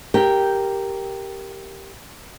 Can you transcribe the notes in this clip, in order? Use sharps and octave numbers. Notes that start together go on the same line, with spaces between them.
G4 A#4 G5